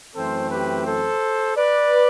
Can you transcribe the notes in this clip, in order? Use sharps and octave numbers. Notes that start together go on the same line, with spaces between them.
F#2 E3 A3 C4 A4 C5
G4 B4
A4 C5
B4 D5